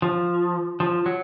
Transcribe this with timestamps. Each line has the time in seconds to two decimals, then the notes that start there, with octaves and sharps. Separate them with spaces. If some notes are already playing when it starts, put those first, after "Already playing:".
0.02 F3
0.80 F3
1.06 F#3